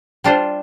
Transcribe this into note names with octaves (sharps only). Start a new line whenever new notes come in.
G3 D4 F4 C5